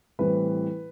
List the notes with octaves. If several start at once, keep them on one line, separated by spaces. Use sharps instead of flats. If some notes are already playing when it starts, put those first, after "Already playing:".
A2 E3 G3 C4 B4